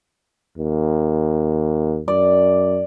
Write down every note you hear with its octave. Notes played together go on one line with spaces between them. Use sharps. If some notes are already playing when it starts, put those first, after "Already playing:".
D#2
F#2 D5